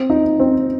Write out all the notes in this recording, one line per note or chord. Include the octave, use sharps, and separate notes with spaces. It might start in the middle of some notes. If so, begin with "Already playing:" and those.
Already playing: C4
D#4
C4